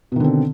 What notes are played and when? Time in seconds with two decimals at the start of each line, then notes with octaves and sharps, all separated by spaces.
0.12 B2
0.16 D#3
0.20 D3
0.24 C4